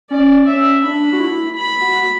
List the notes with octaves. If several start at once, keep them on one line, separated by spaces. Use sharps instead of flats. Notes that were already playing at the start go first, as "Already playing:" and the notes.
C#4 D5
C#4 E5
D4 B5
F#4
E4
B5
F#4